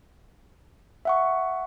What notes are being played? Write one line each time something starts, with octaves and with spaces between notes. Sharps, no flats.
E5 F#5 C#6